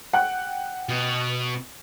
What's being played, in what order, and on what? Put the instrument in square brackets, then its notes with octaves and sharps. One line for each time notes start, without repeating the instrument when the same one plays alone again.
[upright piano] F#5 G5 F#6
[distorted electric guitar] B2